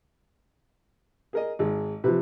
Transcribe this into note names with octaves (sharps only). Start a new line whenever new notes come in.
G#4 A#4 D#5
G#1 G#3
C3 F3 B4